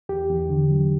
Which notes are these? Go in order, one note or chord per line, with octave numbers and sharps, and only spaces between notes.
E2 G4
E2
D3
F#3